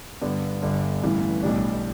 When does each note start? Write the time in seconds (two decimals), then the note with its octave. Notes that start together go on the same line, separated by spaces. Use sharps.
0.21 G2 D3 B3 D4
0.62 G1 G2 D3
1.02 A1 G2 E3 A3
1.42 B1 A2 G3 D4